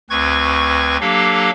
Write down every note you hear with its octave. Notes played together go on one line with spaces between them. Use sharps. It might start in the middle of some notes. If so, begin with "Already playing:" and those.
D2 C4 B4 C#6 G#6
F#3 A#3 D4 G4 A4 F5